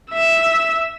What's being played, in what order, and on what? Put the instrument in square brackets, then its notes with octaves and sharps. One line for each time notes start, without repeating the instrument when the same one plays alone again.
[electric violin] E5 E6